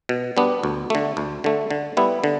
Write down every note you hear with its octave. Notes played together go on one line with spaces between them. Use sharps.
B2
G3 B3 D4
D2
D3 A3
D2
D3 A3
D3
G3 B3 E4
D3